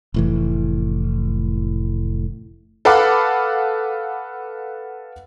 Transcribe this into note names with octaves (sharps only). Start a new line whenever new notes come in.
F1 A2 E3
A4 B4 F5 F#5 B5 D6